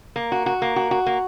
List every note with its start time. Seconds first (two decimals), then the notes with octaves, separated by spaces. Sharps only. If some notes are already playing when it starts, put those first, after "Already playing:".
0.16 A#3
0.32 F#4
0.46 F#4
0.62 A#3
0.76 F#4
0.91 F#4
1.06 A#3